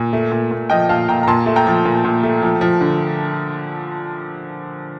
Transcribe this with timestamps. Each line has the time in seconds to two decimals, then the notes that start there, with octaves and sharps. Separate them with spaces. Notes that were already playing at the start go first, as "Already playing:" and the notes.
Already playing: A#2
0.13 A3
0.32 A#2
0.51 A#2
0.70 F3 D#5 G5
0.89 A#2 F5 A5
1.08 A#2 G5 A#5
1.23 A#5
1.27 A#2 A5 C6
1.46 A3
1.56 G5 A#5
1.67 F3
1.85 A#2
2.05 A#2
2.23 A3
2.42 F3
2.61 F3
2.81 D3